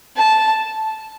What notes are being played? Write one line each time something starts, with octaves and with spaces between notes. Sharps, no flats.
A5